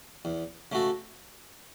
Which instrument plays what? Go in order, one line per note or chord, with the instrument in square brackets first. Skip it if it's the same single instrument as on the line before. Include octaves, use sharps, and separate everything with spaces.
[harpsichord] E2
C#3 A3 F#4 A4